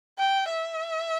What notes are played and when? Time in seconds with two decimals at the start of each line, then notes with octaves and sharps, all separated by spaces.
0.19 G5
0.50 E5